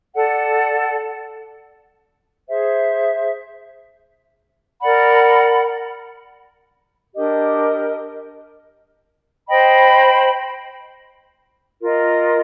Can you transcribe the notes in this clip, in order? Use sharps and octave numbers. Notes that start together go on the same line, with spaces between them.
A4 D5 F#5
G#4 C5 E5
A#4 D5 F#5 B5
D4 G4 A#4 D#5
C5 D#5 G5 B5
F4 A#4 D#5